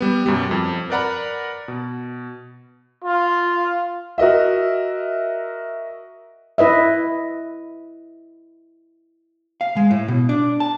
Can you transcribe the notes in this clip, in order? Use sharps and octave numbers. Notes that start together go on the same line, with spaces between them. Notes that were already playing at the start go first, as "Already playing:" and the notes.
G3 B3
F#2 B2 G3
F2
A#4 B4 D5 F#5 A#5 B5
B2
F4
F#4 A#4 D#5 E5
E4 B4 D#5 E5
F5
G#3
A2
B2
D4
A5